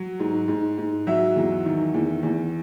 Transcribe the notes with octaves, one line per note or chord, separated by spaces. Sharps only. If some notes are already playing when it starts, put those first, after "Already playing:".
Already playing: F#3
G#2
G#2
G#2
F#3 E5
E2
D#3
E2
E2